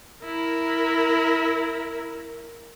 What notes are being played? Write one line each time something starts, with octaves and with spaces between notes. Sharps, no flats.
E4 A#4